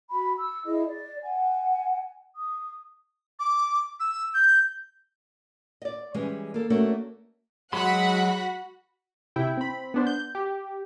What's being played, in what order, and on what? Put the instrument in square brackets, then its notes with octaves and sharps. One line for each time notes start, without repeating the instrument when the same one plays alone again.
[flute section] F#4 B5
E6
E4 G#4 D#5
D5
F#5 G#5
D#6
[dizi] D6
E6
G6
[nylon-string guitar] D5 D#5
E3 G3 G#3 C#4
A#3 A4
A3 A#3 C#4 D4 F#4 A4
[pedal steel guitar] F#3 G#3 C6 [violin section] F#4 F#5 B5
[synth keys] C3 E4 G5
C4 B5
B3 D4 C5
G6
G4